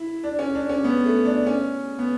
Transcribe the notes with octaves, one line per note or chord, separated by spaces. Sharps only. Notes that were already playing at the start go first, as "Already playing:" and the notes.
Already playing: E4
D4
C#4
D4
C#4
B3
A3
D4
C#4
B3